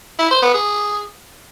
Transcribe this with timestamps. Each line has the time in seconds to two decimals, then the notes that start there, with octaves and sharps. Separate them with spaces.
0.19 E4
0.31 C5
0.42 B3
0.54 G#4